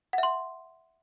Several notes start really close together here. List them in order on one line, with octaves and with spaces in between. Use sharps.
F#5 E5 C6